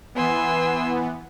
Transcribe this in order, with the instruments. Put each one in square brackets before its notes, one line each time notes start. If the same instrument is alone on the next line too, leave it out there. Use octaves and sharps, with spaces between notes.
[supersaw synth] E3 B3 [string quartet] G#5 C6 E6